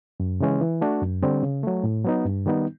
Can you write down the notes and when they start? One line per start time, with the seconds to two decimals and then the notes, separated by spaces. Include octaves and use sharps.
0.20 F#2
0.40 C#3 E3 G#3 C#4
0.61 E3
0.81 A3 D4 F#4
1.02 F#2
1.22 D3 G3 C4
1.43 C#3
1.63 F#3 A3
1.84 A2
2.04 F#3 B3 D#4
2.25 G2
2.46 D#3 G3 B3 D#4